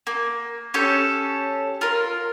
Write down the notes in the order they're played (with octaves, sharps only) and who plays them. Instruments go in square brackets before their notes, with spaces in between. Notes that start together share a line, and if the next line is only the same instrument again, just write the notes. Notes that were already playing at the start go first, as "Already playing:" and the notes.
[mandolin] A#3
C#4 G4 A4 C#5
F4 A#4